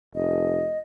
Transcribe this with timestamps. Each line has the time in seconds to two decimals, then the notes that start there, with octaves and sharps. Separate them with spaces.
0.15 F1 D#5